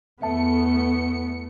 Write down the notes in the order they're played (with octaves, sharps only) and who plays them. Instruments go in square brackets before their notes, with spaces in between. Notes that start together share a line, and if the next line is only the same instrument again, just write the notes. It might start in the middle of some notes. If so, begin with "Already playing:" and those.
[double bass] E2 B3 [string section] A3 C#7 [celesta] E5 A5